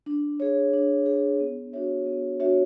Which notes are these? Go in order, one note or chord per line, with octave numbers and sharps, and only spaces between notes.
D4
G#4 C#5
D4
G#4 C#5
B3
D4 F#4 C#5 E5
B3
D4 F#4 C#5 E5